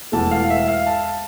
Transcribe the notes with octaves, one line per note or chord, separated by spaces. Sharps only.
E1 E2 E3 A3 A5
F5
E5
F5
A5